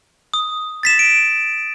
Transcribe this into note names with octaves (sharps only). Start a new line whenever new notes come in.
D#6
A6 B6 E7
D7